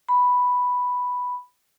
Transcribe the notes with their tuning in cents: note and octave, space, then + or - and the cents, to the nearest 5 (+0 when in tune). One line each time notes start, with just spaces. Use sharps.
B5 +0